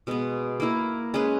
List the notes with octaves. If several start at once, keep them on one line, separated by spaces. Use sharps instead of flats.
B2 G#3 B3
A#3 E4 A#4
G#3 C#4 G#4 B4